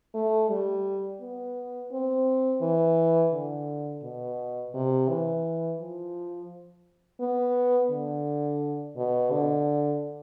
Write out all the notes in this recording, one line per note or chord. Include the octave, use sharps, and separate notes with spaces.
A3
G3
B3
C4
E3
D3
B2
C3
E3
F3
B3
D3
B2
D3